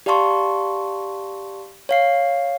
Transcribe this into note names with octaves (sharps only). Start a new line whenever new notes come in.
G4 D5 F5 A5 C6 C#6
C#5 F5 C7